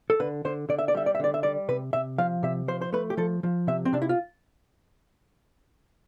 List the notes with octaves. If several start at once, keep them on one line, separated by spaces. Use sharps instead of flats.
A4
D3 B4
D3 C5
D3 D5
E5
D5
G3 E5
D5
E5
D3 D5
E5
G3 D5
C3 B4
C3 E5
F3 F5
C3 E5
F3 C5
C5
A3 B4
G4
F3 A4
F3
C3 E5
C4
C3 D4
E4
F4